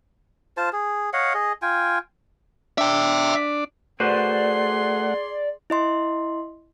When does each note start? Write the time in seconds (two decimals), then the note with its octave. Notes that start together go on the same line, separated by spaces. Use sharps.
0.57 F4 C5 A5
0.73 G#4
1.13 C#5 D#5 F5 F#5
1.34 G#4 D#5
1.62 F4 G5 G#5
2.78 D4 D5 E5 G5
4.00 A3 F#4 G#4 B4 C5 D5 F#5 C6
5.70 E4 D#5 C6